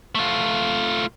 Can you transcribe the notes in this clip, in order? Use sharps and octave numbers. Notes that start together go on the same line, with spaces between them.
A3 F4